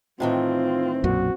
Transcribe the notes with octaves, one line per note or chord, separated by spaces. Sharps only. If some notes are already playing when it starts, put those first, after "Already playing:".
A2 D#3 E3 C4 F4
B1 F#2 A#2 F#4